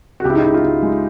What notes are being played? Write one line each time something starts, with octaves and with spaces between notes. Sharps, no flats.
F#4
C#2 G4
E4
D#4
C#2 E4
F4
C#2
G#3